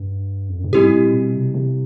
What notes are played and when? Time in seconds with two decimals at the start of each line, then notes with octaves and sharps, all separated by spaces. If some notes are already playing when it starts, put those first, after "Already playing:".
Already playing: G2
0.49 F2
0.57 F#2
0.64 G2
0.73 G#2 G3 C4 E4 G4
0.93 A#2
1.13 B2
1.34 C3
1.54 C3